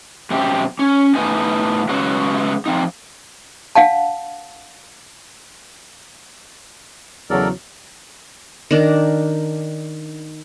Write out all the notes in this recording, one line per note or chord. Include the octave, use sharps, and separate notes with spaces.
F#2 B2 C4 G4
C#4
A2 B3 D#4 G#5
C#3 F#3 G#3 B3 F#4
F3 C4 D#4
D4 F5 F#5 A5
E2 C#3 F#3 A4 A#4 D5
D#3 D4 A#4